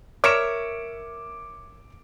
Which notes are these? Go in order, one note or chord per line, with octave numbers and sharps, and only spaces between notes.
A#4 C#5 E5 D6 C#7 E7